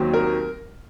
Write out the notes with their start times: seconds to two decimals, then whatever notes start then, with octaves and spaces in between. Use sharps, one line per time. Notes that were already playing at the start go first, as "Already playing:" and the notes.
Already playing: D#2 D#3 F#3 C4
0.14 A#4